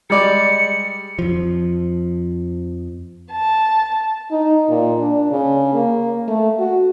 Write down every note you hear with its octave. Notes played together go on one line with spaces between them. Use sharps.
G3 G#3 D5 C#7
F2 F3
A5
D#4
A#2
D4
C#3
A#3
A3
F#4